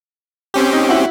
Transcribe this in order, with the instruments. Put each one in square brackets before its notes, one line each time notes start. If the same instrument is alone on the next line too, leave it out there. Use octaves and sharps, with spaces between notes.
[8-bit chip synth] C4 C#4 G4
[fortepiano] D#4
E4 F#4